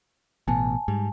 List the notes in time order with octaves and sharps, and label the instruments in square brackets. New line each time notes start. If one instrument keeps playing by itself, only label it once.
[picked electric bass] A1 B2 [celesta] G#5 A5
[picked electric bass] G#2 G3